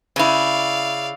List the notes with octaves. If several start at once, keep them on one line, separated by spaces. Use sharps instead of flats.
C#3 E4 D5 F5